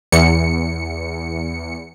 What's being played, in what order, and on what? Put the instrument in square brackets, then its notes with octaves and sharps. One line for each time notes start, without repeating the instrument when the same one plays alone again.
[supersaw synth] E2 C#7